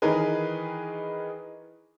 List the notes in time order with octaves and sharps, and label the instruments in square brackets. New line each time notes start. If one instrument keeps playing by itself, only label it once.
[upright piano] D#3 E3 D#4 G#4 A#4 B4